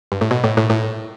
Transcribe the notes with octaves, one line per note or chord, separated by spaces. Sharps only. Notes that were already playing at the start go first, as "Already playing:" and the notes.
G2
A2
B2
A2
A2
A2